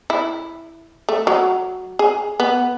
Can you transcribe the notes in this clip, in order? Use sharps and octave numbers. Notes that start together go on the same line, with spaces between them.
E4
A3
F#3
G#4
B3